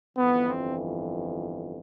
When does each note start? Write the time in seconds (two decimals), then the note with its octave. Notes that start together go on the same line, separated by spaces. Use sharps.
0.16 G1 F2 E3 B3
0.48 C4